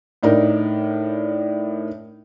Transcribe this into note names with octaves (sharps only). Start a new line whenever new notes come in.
A2 D4 D#4 A#4